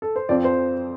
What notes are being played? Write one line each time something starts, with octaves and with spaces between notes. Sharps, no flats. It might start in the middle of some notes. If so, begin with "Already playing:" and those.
A4
C5
F2 F3 C4 D5
C5